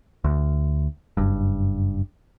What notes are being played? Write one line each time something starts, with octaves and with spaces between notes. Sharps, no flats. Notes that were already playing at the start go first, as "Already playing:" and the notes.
D2
F#1 G2